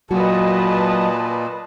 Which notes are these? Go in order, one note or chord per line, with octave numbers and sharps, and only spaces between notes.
A#2 F#3 F#4 B4 D#5 A5